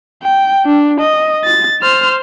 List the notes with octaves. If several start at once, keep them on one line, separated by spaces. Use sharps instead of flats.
G5
D4
D#5
A6
C5 F6